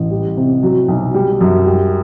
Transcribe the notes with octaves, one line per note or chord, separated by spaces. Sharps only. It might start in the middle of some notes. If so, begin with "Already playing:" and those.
Already playing: A1
G3
C3
F#3
B1
G3
F#2
G3